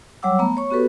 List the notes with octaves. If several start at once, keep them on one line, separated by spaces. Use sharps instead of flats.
F#3 G3 C#5 F#5 D6 E6
A3 B3 A#5 B5
C#5 C#6
B3 F#4 G4 A4 B4